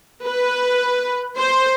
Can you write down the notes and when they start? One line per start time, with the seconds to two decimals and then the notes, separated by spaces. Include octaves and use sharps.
0.25 B4
1.38 C5